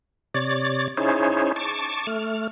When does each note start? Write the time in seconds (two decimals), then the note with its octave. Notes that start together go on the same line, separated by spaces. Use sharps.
0.34 C3 C#5 D5 A6
0.97 C#4 D#4 E4 G#4 C5 C#5
1.56 A5 C#6 D6
2.07 A3 F6